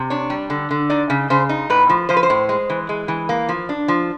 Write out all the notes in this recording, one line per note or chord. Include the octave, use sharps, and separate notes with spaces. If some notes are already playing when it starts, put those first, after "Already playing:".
Already playing: C3
D4 C#5
G3
D3
D3
D#4 D5
C#3
C#3 C5
D#4
A2 B4
F3
F3 C5
B4
C5
A2
G#3
E3
G#3
E3
A#3
F3
D4
F3